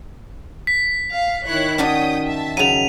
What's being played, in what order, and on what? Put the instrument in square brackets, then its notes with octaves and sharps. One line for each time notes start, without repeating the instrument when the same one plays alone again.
[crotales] B6
[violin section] F5
[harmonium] D#3 [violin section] E4 C#5 F#6
[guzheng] C#4 D4 F#4 [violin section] C#5 G5 D#6
[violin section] E5 A5
[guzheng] C#3 F#3 [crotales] D#7 F7